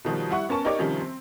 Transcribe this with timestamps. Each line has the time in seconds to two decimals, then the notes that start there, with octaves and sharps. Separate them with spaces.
0.05 B2 D#3 F3 G3
0.29 G3 E4 F#5 C#6
0.49 B3 C#4 A#4 A5 C#6
0.65 D#4 G4 A#4 C#5 D5 D6
0.79 C3 D#3 F3 G3 C#4
1.00 C4